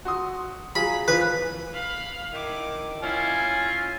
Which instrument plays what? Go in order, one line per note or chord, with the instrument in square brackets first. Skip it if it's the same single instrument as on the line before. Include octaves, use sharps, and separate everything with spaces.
[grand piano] F#4 C6 D#6
[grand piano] F#3 F4 G#4 [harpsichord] B5
[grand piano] E3 F3 F4 [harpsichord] B4
[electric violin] F5 B5
[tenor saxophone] D#3 [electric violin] E4 D6
[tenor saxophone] C#4 [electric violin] E4 [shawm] F4 [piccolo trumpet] G#5